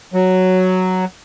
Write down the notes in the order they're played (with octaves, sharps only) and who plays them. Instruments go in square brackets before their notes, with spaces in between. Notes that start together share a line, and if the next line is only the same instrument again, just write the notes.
[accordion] F#3